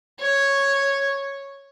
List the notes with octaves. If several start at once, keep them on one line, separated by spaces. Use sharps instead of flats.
C#5